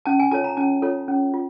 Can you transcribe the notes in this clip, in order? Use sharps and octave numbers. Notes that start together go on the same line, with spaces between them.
C#4 A5
G#5
F4 A4 C#5 A5
A#5
C#4 A5
F4 A4 C#5
C#4
F4